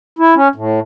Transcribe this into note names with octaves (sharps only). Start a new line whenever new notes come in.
E4
C#4
A2